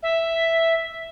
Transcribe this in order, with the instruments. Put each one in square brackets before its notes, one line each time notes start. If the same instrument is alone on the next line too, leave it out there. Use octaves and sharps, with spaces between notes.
[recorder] E5